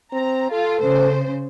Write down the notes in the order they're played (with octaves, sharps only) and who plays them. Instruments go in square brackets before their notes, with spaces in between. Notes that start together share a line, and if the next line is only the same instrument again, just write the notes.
[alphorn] C4 [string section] A#5
[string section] F4 [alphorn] A4
[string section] C#3 C5